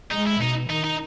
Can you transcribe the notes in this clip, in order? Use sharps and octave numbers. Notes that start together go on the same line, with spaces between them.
G#3 D#4
E4
B2 D#4
D#3 D#4
D#4